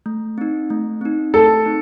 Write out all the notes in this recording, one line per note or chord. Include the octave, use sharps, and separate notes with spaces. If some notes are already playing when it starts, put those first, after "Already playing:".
A3
C4 D#4
A3
C4 D#4
A3 A4
C4 D#4